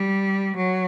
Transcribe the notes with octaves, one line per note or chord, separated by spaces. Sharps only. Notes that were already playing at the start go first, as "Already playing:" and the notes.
Already playing: G3
F#3